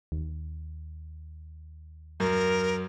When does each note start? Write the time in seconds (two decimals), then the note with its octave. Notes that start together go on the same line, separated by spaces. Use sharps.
0.12 D#2
2.20 F#2 A#4